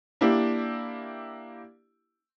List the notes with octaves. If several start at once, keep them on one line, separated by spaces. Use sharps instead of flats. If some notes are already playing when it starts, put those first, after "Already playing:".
A#3 D4 E4 G4